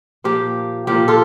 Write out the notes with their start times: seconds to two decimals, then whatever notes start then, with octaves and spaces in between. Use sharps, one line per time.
0.24 A#2 F3 A#3 G4
0.87 A#2 F3 A#3 G4
1.08 F4 A4